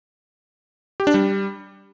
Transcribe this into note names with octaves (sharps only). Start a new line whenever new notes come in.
G4
D4
G3